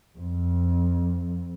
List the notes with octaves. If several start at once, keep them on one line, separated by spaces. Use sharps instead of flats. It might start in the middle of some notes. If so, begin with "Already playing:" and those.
F2